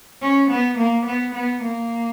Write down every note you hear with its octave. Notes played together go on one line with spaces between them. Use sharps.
C#4
B3
A#3
B3
B3
A#3